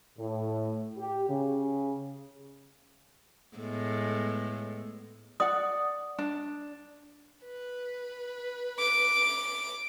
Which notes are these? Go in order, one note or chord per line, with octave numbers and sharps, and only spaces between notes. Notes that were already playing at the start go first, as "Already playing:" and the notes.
A2
G4
C#3
A2 G#3 B3
D5 F#5 D#6
D4
B4
D6